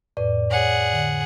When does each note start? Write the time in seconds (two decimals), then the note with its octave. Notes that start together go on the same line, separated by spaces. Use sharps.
0.17 F2 A2 B4 D5
0.50 G#4 C#5 F#5
0.93 D3